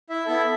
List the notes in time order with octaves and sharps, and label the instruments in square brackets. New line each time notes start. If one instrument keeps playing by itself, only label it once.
[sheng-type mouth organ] E4 E5
B3 E4 A4